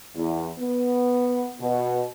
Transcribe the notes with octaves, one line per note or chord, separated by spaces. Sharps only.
E2
B3
B2